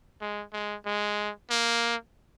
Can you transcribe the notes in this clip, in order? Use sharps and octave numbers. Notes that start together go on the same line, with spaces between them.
G#3
G#3
G#3
A#3